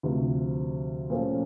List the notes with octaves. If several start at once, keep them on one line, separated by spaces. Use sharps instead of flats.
D2 C3 F3
A#2 F3 A3 C#4 F4